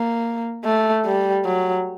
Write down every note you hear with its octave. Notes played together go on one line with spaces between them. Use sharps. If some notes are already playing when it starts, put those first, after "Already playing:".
Already playing: A#3
A3
G3
F#3